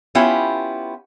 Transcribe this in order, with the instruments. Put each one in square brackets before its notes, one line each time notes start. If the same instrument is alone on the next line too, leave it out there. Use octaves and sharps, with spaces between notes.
[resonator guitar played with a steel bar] B3 C#4 E4 F4 G4